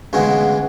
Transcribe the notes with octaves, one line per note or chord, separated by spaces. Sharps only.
D2 C#3 E3 G#3 B3